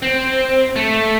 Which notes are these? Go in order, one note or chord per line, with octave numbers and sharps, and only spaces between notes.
C4
A3